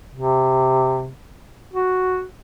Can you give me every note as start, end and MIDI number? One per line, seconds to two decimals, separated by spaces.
0.15 1.10 48
1.74 2.24 66